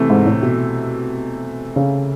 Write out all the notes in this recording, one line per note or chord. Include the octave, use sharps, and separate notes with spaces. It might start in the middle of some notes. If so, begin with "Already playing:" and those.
Already playing: C3 E3 A3
G#2
A2
B2
C#3